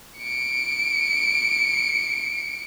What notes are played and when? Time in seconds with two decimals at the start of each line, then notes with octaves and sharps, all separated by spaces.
0.19 C#7 D7